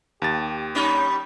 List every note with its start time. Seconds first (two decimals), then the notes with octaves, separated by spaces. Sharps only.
0.22 D#2 G4 A6
0.75 G3 C#4 D#4 B5